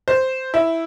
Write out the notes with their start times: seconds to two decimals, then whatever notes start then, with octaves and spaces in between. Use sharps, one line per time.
0.08 C5
0.54 E4